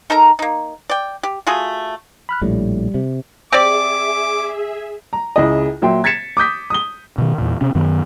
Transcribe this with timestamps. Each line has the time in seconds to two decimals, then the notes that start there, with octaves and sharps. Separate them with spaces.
0.10 D#4 A4 A#4 A#5
0.39 A#3 D#4
0.90 D5 G5
1.23 G4
1.47 A3 F4 F#4 G#4
2.29 B5 F6 F#6
2.42 A#1 A2 G3
2.94 C3
3.52 C4 G4 G#4 D5 E5 D6
5.13 A#5
5.36 C#2 C#3 E4 D#5
5.82 A#2 F#3 E5 G5 C6
6.04 G#6 A6 B6 C#7 E7
6.37 D6 D#6 G6 B6
6.70 D#6 G7
7.18 B2 D#3
7.38 E2 A#2
7.61 C3 C#4
7.75 F#2 D#3 B3